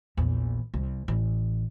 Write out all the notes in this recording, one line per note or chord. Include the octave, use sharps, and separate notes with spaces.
A#1 E2
C2
A1